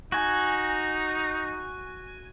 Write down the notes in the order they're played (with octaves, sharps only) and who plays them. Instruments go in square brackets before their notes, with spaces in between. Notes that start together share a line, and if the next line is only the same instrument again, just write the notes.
[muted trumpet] D#4 [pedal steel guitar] F#4 G#5